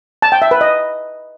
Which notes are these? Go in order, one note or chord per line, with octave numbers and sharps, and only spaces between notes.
A5
G5
E5
B4
D#5